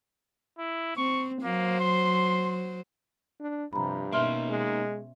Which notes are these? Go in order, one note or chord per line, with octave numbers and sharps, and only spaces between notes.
E4
C4 C#6
F#3 A#3 C5
C6
D4
G2 C3 F3 A#5 B5
B2 A#3 C#4 D#4 E5 C6 F6
G#3